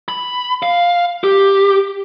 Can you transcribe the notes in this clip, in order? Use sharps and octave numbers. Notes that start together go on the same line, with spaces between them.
B5
F5
G4